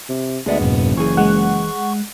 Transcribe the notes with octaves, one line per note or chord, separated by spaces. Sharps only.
C3
D2 G#3 B3 D4 D5 E5
F#1 F2 G#2 B2
E3 G#4 C#6
G#3 F#5